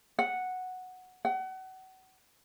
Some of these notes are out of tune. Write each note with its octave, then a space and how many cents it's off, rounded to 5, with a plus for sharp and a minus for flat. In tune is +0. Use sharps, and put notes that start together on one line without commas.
F#5 -5
F#5 +30